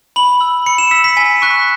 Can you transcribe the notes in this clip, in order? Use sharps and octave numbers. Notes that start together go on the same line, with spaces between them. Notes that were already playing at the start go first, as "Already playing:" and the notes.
B5 F#7
E6
B5 C#7
E7
E6 B6
B6
G#5 B6
C#6 F#6